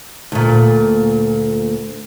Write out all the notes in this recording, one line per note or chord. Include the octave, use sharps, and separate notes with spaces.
D2 A#2